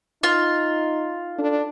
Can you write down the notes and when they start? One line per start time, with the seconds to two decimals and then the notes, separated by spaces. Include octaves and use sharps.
0.23 D#4 F4
1.38 D4 A4